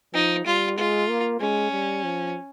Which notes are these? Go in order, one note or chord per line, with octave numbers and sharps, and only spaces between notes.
F3 D#4
G3 F4
G#3 F4
A#3
G#3 C#4
G3
F3